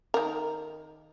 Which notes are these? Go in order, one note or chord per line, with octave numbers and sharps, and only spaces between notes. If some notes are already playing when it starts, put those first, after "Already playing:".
D#3 A#4